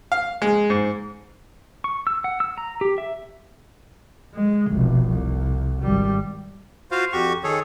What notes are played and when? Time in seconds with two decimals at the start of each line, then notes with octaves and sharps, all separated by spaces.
0.12 F5
0.42 G#3
0.70 G#2
1.84 C#6
2.07 E6
2.24 F#5
2.40 E6
2.58 A#5
2.81 G4
2.98 E5
4.34 G#3
4.70 F1 B1
5.09 C2
5.82 G#1 G3
6.91 F4 F#4 C5 F5
7.13 F2 F#4 G4 C#6
7.44 D#3 G#4 A4 C#5